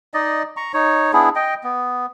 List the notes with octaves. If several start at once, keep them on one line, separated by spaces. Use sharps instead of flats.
D#4 D5 D#5
A#5 C#6
D#4 C#5
B3 D4 E4 G#4
D#5 G5
B3